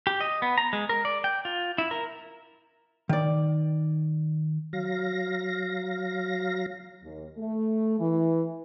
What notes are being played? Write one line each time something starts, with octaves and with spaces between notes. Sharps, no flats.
G4
D#5
B3
A#5
G#3
A#4
D5
G5
F4
E4
A#4
D#3 D5
F#3 F5 A#6
D#2
A3
E3